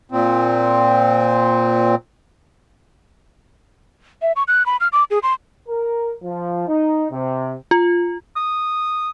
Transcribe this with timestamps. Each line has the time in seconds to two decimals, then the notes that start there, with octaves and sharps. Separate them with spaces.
0.12 A#2 C4
4.22 E5
4.36 C#6
4.48 F#6
4.66 B5
4.80 F6
4.93 D6
5.11 G#4
5.23 C6
5.69 A#4
6.24 F3
6.68 D#4
7.12 C3
7.71 F4
8.36 D#6